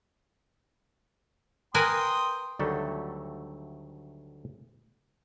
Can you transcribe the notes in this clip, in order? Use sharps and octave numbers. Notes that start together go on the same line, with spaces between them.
A#4 B4 G5 G#5 C6 D#6
D2 D#3 F#3 G3 A3 A4